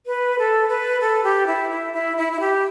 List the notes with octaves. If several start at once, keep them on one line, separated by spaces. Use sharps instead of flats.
B4
A4
B4
A4
G4
E4
E4
E4
E4
E4
G4